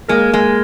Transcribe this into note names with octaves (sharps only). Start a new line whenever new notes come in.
G#3 A#3 A#4
G#3